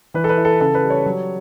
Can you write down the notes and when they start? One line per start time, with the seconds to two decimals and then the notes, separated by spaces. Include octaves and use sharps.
0.14 E3 B4
0.24 A4
0.29 B4
0.37 E4
0.45 A4
0.60 C#3 A4
0.74 B4
0.83 G3
0.90 C#5
1.06 F#3